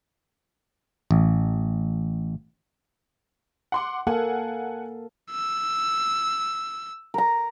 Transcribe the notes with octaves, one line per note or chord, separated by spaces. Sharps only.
A1
F#5 C6 D6
A#3 A4 F5 F#5 G#5
E6
A#4 A#5